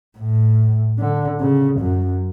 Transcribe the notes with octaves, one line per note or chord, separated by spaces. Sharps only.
A2
D3
C#3
F#2